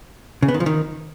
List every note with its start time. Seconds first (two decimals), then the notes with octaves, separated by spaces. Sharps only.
0.43 C#3
0.48 B3
0.54 D#3
0.60 F3
0.66 D#3